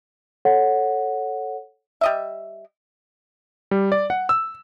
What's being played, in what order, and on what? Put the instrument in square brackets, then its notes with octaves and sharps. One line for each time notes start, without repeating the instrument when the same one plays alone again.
[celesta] A4 C#5 F#5
[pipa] G3 D#5 E5
[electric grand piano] G3
D5
F#5
E6